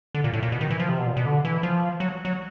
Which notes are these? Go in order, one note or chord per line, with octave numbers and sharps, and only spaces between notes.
D3
A#2
A2
A#2
B2
D#3
E3
F3
C3
B2
A#2
B2
D3
E3
F3
F#3
F#3